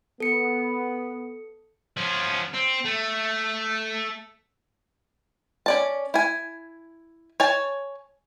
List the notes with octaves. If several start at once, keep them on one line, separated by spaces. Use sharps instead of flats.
B3 A4 C#7
F3 C#4
C4
A3
C#4 D5 A5
E4 G#5
C#5 G#5 A5